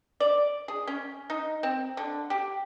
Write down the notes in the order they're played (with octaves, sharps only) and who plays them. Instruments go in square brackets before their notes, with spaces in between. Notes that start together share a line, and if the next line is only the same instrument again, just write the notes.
[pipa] D5
G#4
C#4
D#4
C4
D3
G4